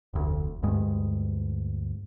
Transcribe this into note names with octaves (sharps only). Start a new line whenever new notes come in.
F1 D2
D2 G2 G#3